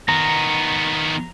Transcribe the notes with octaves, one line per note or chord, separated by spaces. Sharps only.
D#3 B3 A#5